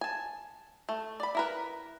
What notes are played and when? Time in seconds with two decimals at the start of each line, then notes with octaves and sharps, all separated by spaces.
0.01 G#5 A5
0.89 A3
1.20 D5 B5
1.35 E4 A#4 B4